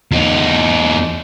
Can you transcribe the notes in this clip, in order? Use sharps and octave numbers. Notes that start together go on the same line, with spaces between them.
E2 D#4